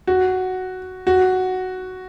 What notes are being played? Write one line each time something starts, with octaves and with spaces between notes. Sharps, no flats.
F#4
F#4